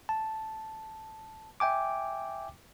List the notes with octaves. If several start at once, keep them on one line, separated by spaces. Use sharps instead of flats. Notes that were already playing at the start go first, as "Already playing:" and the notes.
A5
E5 G5 G#5 D6